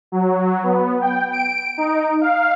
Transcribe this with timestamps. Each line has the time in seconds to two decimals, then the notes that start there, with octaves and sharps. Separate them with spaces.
0.12 F#3
0.63 B3
1.02 G5
1.32 D7
1.78 D#4
2.21 F5